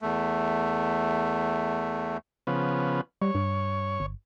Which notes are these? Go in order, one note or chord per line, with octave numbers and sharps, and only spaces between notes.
E2 A3
C#3 F3 B3
G3 C#5
G2
G1